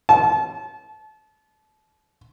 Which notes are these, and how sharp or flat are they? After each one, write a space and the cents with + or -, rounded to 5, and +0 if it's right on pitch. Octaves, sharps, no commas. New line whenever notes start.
A5 -30